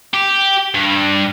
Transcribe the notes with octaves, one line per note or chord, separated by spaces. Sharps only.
G4
G2